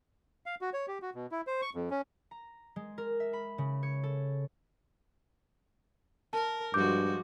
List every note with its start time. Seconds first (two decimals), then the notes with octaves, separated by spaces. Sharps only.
0.46 F5
0.61 F#4
0.73 C#5
0.88 G4
1.02 F#4
1.15 B2
1.31 E4
1.47 C5
1.62 C#6
1.75 F2
1.90 C#4
2.31 A#5
2.76 G#3
2.98 A#4
3.20 E5
3.33 B5
3.58 C#3
3.83 C#5
4.03 A4
6.33 A#4 A5
6.74 G2 F3 G#3 F#4 D6 G6